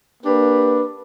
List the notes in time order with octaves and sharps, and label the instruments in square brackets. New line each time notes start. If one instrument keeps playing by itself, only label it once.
[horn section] A#3 D4 G4 B4